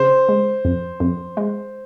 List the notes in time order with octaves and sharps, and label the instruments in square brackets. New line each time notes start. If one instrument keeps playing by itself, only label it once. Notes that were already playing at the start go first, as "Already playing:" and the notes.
Already playing: [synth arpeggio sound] C#3 [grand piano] C5
[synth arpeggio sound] G#3
F2
F2
G#3